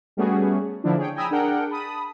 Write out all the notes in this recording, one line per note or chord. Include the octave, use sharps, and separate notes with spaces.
G3 A3 B3 C#4 F#4 G#4
D3 F3 A#3 D4 E4
G#4 C#5 G5
G5 G#5 A#5 B5 D#6 E6
D4 G#4 A#4 F#5 G5
A5 B5 D#6